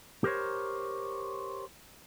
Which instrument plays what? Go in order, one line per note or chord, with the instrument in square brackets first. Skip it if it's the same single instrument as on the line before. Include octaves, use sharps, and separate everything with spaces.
[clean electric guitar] G4 A#4 C5 C#5